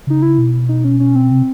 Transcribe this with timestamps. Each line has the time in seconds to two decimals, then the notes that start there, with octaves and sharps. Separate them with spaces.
0.07 C#3 D#4
0.22 E4
0.38 B2
0.69 D#4
0.84 C#4
1.00 C#4
1.16 C4
1.31 C3